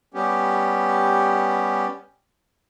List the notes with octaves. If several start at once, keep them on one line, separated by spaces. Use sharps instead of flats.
G3 B3 C#4 G4